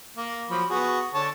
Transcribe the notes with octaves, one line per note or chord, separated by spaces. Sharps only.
A#3
F3 F#3 B5
B3 F#4 G#4
D3 C#5 A5